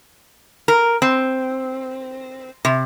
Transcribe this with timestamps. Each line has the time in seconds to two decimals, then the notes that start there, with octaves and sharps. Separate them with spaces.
0.68 A#4
1.02 C4
2.65 C3